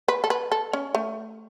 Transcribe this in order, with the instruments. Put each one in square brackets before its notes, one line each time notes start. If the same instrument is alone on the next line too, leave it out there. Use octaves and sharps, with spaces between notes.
[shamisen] B4
A4
B4
A4
C#4
A3